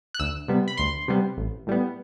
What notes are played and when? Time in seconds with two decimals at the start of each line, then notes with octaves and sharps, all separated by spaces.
0.14 F#6
0.20 D2 E6
0.48 C3 G3 B3
0.68 B5
0.77 D2 C6
1.08 C3 G3 B3
1.37 A1
1.67 A2 G3 B3